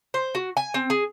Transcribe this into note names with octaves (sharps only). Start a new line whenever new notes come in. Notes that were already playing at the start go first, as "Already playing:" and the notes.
C5
F#4
G#5
C4
G#4